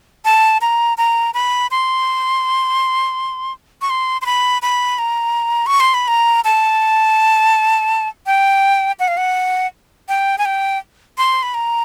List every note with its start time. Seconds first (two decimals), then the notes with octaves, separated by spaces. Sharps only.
0.25 A5
0.61 A#5
0.98 A#5
1.34 B5
1.71 C6
3.82 C#6
3.90 C6
4.22 C6
4.26 B5
4.62 B5
4.98 A#5
5.66 C#6
5.80 C6
5.94 B5
6.08 A#5
6.44 A5
8.26 G5
8.99 F#5
9.08 F5
9.17 F#5
10.09 G5
10.38 G#5
10.45 G5
11.18 C6
11.43 B5
11.54 A#5